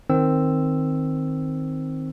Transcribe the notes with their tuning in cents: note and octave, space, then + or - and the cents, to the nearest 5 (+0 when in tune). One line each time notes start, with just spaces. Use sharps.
D#3 +0 C4 +0 E6 +0